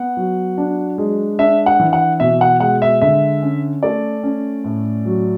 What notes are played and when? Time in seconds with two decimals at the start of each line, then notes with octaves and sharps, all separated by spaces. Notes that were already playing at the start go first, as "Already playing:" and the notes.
Already playing: B3 F#5
0.17 F#3
0.58 D4
0.98 G#3
1.39 D4 E5
1.66 F#5
1.80 E3
1.93 F#5
2.20 B2 E5
2.41 F#5
2.60 G#3 F#5
2.82 E5
3.01 D3 E5
3.43 C#4
3.83 A3 D5
4.23 C#4
4.64 A2
5.05 F#3